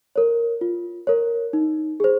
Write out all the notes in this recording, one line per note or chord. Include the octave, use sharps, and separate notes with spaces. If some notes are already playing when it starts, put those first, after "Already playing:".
A#4 C#5
F4
A#4 C#5
D#4
G#4 C5